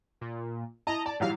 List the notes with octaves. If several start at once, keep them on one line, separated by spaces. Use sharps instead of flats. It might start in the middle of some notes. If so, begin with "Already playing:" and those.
A#2
E4 D#5 A5 A#5
D5 A5
G#2 E3 F#3 G3 F5